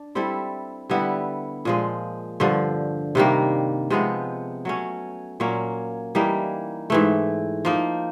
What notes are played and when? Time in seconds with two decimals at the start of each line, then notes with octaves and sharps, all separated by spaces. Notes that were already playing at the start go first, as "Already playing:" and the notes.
Already playing: D4
0.15 G3 C4 E4 A4
0.90 D3 G3 B3 E4
1.65 A#2 F3 G#3
2.40 G2 D3 F3
3.15 C3 D#3 G3 A#3
3.90 C3 F3 G#3 B3
4.65 F#3 A3 C#4
5.40 A#2 F#3 A#3 C#4
6.15 E3 G3 A#3 D#4
6.90 G#2 E3 A3
7.65 F3 A#3 D#4